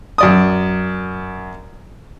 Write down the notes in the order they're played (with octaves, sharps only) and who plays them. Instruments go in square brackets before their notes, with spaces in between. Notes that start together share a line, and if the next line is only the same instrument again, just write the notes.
[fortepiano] F#2 D5 D#6